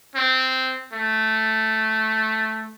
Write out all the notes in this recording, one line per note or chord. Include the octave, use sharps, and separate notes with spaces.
C4
A3